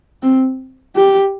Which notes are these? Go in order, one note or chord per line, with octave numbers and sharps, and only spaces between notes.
C4
G4